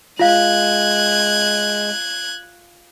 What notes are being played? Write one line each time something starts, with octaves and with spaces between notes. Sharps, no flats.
G#3 F4 F5 F#6 G#6